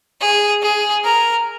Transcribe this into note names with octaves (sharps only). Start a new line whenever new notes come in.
G#4
G#4
A#4